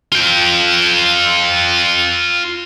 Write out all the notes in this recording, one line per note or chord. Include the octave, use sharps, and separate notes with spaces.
F4 G5